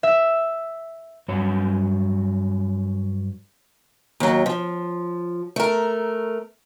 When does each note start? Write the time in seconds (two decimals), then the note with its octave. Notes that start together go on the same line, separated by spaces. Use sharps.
0.03 E5
1.28 G2 F#3 C#5
4.20 D#2 F#3
4.46 F3
5.56 A3 A#4